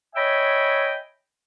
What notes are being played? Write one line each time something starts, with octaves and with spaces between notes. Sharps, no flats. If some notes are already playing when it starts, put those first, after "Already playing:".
C#5 D#5 E5 G5 G#5 B5